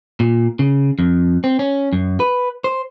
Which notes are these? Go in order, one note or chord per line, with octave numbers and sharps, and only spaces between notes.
A#2
C#3
F2
C4
C#4
F#2
B4
C5